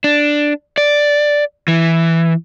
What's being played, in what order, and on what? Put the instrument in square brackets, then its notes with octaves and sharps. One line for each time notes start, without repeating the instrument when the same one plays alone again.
[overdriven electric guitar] D4
D5
E3